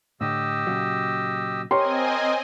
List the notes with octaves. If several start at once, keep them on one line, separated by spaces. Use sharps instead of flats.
A2 D3 G4 D#5 E6
A#2 C#3 F#3
C4 G4 A#4 C#5 D#5 G#5 C6